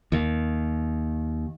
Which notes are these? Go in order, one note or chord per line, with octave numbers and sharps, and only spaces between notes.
D#2